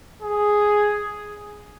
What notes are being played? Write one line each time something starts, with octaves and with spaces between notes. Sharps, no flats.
G#4